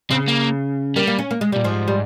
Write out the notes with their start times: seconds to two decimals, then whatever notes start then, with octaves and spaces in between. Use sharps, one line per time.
0.10 C#3 C4
0.28 A#3
0.96 G3 A#3
1.07 A#3
1.18 C#4
1.31 A#3
1.41 G#3
1.52 A#2 G3
1.64 G#2 F3
1.88 G3